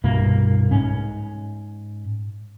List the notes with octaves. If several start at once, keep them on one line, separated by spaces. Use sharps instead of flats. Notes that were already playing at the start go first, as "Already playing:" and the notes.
C2 G2 B2 A#3
G#2 C#4